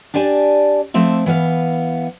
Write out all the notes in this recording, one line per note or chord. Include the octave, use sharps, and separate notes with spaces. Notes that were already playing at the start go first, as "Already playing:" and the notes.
D4 G4 D5 G#5 A5
F3 A3 C4 E4
E3 B3 D#5 F5